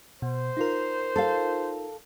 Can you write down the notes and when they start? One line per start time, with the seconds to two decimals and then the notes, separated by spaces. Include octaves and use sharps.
0.22 B2 C5
0.57 D#4 F4 A#4
1.16 A4 F5